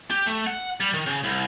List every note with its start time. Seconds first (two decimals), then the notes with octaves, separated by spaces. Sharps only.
0.11 G4
0.26 A3
0.47 F#5
0.80 G3
0.93 D#3
1.06 C#3
1.23 C2